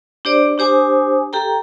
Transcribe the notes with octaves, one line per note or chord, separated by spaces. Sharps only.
D4 G4 C5 D5
D4 G4 C5 G#5 D#6
G4 A4 G5 A#5